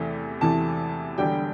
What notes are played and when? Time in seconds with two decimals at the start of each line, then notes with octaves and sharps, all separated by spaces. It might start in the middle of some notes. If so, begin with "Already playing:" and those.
Already playing: E2 C3 E3 A3
0.41 E2 C3 E3 A3 A5
1.18 E1 E2 D3 G3 G5